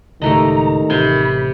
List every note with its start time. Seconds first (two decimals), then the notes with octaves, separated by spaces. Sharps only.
0.22 C#2 A2 D#3 G3 A3 D#5 A#5
0.90 A1 C3 G#5 B5 C6